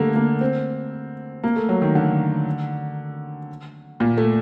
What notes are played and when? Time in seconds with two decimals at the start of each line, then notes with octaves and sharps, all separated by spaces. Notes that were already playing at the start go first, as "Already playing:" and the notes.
Already playing: D3 G3 A3 A#3
0.16 A#3
0.41 C4
1.43 A#3
1.56 A3
1.69 F#3
1.82 D#3
1.95 D3
4.00 A#2
4.17 A3